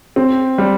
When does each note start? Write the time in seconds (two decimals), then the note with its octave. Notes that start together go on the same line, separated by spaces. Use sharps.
0.16 C4
0.58 G3